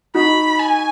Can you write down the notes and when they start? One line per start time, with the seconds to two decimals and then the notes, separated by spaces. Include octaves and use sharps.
0.15 D#4 F#4 B5
0.59 G#5